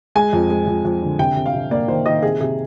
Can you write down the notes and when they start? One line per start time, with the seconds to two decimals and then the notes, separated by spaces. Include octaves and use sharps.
0.15 G#3 G#5
0.33 F2
0.50 G#3
0.67 F2
0.85 F2
1.02 D3
1.19 C3 G5
1.36 C3
1.46 F5
1.54 C3
1.71 A#3 D5
1.88 D#3 C5
2.06 D#3 D#5
2.22 C3 G#4
2.40 C3 G#4